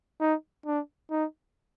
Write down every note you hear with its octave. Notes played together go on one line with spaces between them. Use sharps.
D#4
D4
D#4